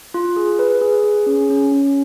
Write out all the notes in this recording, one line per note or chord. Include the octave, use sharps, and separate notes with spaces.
F4
G#4
B4
G#4
G#4
C#4
C#4
C#4